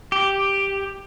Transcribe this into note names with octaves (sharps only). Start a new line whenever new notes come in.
G4